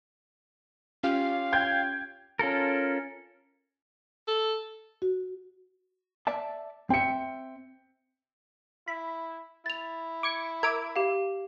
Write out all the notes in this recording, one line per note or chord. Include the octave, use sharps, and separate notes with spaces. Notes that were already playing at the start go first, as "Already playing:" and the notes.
C#4 F4 G4 F5
G5 G6 G#6
C#4 F4 A4 A#4
A4
F#4
D5 E5 A5
C4 E5 G5 C#7
E4 B5
E4 A6 F7
D6 G#6 C#7
A#4 E5 D6 G#6
G4 F5